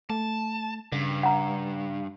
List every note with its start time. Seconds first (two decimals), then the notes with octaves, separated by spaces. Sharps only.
0.10 A3 A5
0.92 G2 C#3
1.23 F#5 A#5